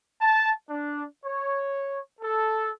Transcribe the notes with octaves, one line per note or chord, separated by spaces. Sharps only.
A5
D4
C#5
A4